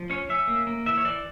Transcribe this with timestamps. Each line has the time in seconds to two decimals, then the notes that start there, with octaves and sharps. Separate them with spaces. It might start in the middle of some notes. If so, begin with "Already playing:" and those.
Already playing: F3
0.10 C#4 C#5
0.29 C#4 E5
0.47 A#3
0.67 A#3
0.86 E3 E5
0.97 C#5
1.05 E3 D5